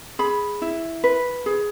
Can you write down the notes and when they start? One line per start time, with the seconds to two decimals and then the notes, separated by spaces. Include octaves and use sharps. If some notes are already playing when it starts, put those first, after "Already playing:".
0.19 G#4 B5
0.62 E4
1.04 B4
1.46 G#4